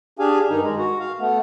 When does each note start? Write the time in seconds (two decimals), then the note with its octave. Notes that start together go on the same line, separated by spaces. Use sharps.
0.19 D4 G4 G#4 F5 G#5
0.49 G2 D#3 D#4
0.63 G#3
0.78 F#4
0.99 F5
1.20 A3 B3